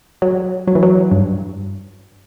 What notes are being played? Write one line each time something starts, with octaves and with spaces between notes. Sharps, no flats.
F#3
F#3
E3
F#3
G2